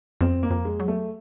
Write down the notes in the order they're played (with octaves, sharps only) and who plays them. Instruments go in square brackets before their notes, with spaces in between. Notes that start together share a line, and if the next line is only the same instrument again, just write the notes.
[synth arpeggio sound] F2 [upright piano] C4
[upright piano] A#3
[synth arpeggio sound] F2
[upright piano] G#3
[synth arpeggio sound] F#3
[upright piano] A3